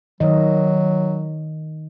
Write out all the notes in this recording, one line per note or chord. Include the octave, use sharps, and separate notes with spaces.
D#3 F#3 D#5